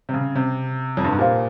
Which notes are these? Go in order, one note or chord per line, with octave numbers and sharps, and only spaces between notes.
C3
C#3
C3
F2
G2
G#2
A#2 G4 C5 F5